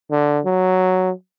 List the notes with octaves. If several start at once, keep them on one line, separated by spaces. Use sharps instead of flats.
D3
F#3